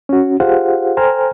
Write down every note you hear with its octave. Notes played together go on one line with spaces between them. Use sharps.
C#4 F#4
F4 G4 G#4 C5 F5 F#5
A4 C5 G5 G#5 A#5 F6